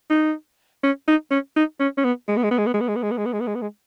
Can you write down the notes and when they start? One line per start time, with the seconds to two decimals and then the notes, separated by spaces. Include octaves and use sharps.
0.10 D#4
0.83 C#4
1.08 D#4
1.31 C#4
1.56 D#4
1.80 C#4
1.97 C#4
2.04 B3
2.28 G#3
2.36 B3
2.43 G#3
2.51 B3
2.58 G#3
2.66 B3
2.74 G#3
2.80 B3
2.88 G#3
2.95 B3
3.02 G#3
3.11 B3
3.17 G#3
3.25 B3
3.33 G#3
3.40 B3
3.47 G#3
3.55 B3
3.62 G#3